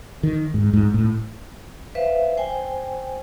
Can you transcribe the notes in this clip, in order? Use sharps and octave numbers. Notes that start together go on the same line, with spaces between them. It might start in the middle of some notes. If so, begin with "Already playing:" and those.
D#3
G#2
G#2
A2
B4 C5 E5 F5
C5 G5 G#5